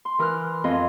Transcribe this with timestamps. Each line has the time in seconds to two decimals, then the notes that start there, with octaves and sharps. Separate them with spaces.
0.05 C6
0.19 E3 A#4 D6 F6 F#6
0.64 F2 D#5 C6